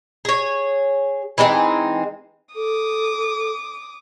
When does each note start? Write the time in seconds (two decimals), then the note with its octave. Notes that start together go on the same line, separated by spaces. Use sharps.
0.25 G#4 C#5
1.38 E3 G#3 C4 D#4
2.55 A4 D6 D#6